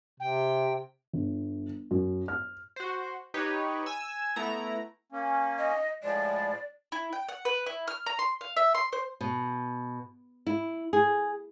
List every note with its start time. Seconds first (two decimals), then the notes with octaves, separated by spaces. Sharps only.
0.20 C3 G5
1.13 G1
1.91 F#2
2.28 F6
2.76 F#4 C5
3.34 D#4 G4 B4 C#5
3.86 G#5 E6
4.36 A3 B3 E4 A#5
5.12 A#3 C#4
5.58 D#5
6.03 A2 F3 G#3 D5
6.92 E4
7.13 G5
7.29 F#5
7.45 B4
7.66 E4
7.88 F6
8.06 A#5
8.19 C6
8.41 F5
8.56 E5
8.75 C6
8.93 C5
9.21 B2
10.47 E4
10.93 G#4